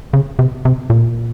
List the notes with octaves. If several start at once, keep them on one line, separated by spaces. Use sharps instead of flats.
C#3
C3
C3
A#2